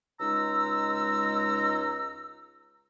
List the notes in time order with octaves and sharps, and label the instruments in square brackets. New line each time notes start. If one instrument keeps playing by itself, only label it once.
[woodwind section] C#2 G#3 D#4 A#5 E6